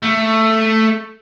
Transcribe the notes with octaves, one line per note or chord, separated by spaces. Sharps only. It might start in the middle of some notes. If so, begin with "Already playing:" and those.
A3